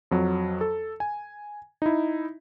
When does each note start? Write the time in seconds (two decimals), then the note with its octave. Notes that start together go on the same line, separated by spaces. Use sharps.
0.11 F2 F#3
0.61 A4
1.00 G#5
1.82 D#4 E4